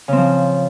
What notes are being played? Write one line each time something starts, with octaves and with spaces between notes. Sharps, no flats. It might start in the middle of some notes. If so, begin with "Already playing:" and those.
C#3 F3 C4